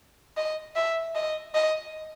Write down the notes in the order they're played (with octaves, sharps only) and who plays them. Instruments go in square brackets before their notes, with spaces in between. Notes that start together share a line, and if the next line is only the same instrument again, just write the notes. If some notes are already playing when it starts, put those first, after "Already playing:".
[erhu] D#5
E5
D#5
D#5